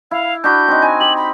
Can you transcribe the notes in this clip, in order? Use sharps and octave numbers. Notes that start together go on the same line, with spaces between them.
E4 F5
D4 F#4 B5 G6
C4 D#4
G#5
G4 F#7
B5